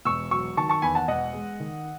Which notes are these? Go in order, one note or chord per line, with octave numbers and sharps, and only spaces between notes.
E1 C#6 E6
F#3 C#6 E6
D#3 A5 C#6
A5 C#6
E2 G#5 B5
F#5 A5
E1 D#5 F#5
G#3
D#3